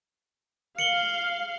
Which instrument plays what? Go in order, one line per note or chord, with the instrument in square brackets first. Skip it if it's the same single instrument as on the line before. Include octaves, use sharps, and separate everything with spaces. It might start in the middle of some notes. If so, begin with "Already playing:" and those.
[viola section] F5 [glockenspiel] C#7 F#7 G7